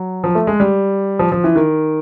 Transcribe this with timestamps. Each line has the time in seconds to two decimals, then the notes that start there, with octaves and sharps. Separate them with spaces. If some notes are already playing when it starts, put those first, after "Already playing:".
Already playing: F#3
0.24 F3
0.35 A3
0.47 G#3
0.60 G3
1.19 F3
1.32 F3
1.44 E3
1.56 D#3